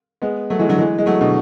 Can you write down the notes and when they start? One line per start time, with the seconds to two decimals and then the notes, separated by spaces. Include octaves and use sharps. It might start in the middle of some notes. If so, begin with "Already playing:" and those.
0.22 G#3 B3
0.50 F#3 A3
0.59 E3 G#3
0.69 D3 F#3
0.78 E3 G#3
0.98 G#3
1.06 F#3 A3
1.21 B2 D3